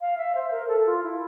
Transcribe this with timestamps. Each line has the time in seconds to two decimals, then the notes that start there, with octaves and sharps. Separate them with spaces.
0.01 F5
0.17 E5
0.35 C5
0.51 A#4
0.68 A4
0.86 F4
1.03 E4